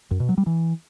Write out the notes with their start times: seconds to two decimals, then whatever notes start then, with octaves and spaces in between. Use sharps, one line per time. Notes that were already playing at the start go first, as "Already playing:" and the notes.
0.11 F#2
0.20 B2
0.29 F#3
0.38 G3
0.46 E3